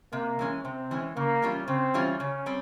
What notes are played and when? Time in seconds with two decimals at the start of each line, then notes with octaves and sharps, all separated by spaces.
0.12 C3 A#3
0.39 E3 G#3 C#4
0.64 C3 C4
0.91 E3 G#3 C#4
1.16 C#3 A#3
1.42 E3 G3 C#4 F4
1.68 C#3 C4
1.94 E3 G3 C#4 F4
2.20 C#3 C#4
2.46 G3 C4